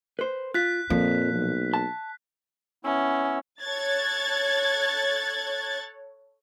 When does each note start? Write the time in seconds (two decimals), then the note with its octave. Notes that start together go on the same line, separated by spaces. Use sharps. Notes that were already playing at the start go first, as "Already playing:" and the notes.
0.19 B4 C5
0.54 F4 F#6 B6
0.90 F2 A#2 F3 A#3
1.34 B1
1.74 A5
2.85 B3 C#4 E4 E6
3.62 A4 C#5 F#6 G#6 A6